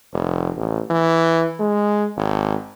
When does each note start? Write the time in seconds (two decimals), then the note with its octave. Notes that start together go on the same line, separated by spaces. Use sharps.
0.13 F1
0.57 A1
0.91 E3
1.59 G#3
2.17 G#1